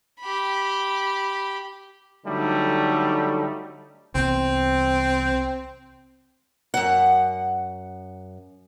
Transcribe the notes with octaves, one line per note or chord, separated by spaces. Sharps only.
G4 B5
D3 F#3 G3 A3 D#4
C2 E3 B3 C4
F#2 F#5